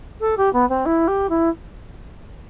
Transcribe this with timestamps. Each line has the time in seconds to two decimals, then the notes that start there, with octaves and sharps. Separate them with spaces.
0.20 A4
0.37 G4
0.53 B3
0.69 C4
0.85 E4
1.07 G4
1.29 E4